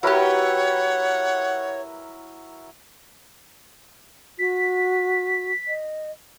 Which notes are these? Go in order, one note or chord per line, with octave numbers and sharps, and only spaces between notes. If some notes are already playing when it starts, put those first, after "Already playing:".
F#3 E4 G4 A#4 B4 C#5 F#5
F#4 B6
D#5